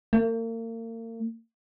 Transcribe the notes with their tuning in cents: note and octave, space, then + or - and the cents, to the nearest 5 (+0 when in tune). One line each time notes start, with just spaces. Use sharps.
A#3 -40